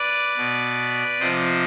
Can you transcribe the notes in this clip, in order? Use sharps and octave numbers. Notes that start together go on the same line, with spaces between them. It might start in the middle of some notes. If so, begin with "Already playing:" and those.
Already playing: B4 D5
B2
C3 F3 C5 D#5